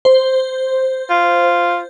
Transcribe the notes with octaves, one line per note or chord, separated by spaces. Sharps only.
C5
F4